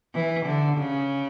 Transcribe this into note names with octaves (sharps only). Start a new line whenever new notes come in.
E3
D3
C#3